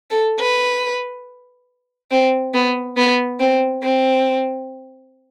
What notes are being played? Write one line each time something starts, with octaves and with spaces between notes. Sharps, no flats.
A4
B4
C4
B3
B3
C4
C4